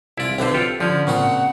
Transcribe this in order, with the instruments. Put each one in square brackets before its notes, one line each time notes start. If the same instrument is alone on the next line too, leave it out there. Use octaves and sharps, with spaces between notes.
[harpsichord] C2 F4 [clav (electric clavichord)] E4 D5
[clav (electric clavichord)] B1 D3 C5 [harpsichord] C4 B4
[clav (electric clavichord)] F4 G4 A4
[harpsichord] D3 [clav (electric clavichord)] F3 C#4
[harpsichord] A#2 C4 F#4 [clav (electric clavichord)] C#3 [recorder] F#5